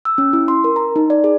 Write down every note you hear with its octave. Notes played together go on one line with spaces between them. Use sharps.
E6
C#4
E4
C6
A#4
A#5
D#4
D5
G#4